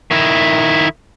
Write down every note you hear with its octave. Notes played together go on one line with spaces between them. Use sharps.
D#3 E4